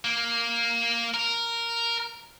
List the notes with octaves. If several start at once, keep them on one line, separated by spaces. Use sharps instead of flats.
A#3
A#4